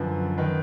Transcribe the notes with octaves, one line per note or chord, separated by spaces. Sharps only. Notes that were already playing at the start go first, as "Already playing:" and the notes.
Already playing: F#2 D3 F3 B4
D#3 B4